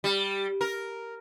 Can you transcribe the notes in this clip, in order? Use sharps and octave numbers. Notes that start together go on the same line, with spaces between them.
G3
A#4